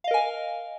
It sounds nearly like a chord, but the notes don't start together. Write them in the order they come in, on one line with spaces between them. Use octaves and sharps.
F5 D#5 A#4 G#5